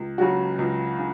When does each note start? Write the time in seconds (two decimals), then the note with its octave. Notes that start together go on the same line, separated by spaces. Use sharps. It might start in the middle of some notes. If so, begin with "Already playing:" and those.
Already playing: C#2
0.18 C#3 F#3 C#4 F#4
0.59 C#2
0.98 C#3